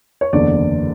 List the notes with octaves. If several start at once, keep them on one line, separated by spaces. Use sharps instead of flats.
C#5
F#1 E2 D3 D5